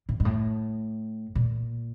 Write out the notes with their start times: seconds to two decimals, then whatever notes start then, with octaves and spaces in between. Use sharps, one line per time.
0.09 A2
0.20 G#2
0.25 A2
1.35 A#2